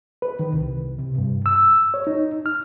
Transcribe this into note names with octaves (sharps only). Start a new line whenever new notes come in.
B4
D#3
C2
C3
G2
E6
C#5
D#4
F6